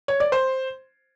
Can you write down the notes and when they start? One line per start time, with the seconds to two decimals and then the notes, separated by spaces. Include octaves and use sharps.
0.08 C#5
0.20 D5
0.32 C5